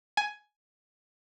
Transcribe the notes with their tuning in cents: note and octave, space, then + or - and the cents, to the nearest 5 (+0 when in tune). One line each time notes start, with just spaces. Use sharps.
G#5 +10